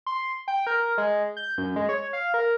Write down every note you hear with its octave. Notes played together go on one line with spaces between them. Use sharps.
C6
G5
A#4
G#3
G6
F#2
G#3
C#5
F5
A#4